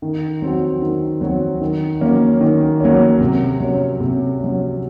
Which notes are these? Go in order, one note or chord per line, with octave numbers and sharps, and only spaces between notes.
D#3
F#3 C4 F#4
D#3
F#3 C4 F#4
D#3
F#3 A#3 C#4
D#3
F#3 A#3 C#4
C3
F#3 C#4
C3
F#3 C#4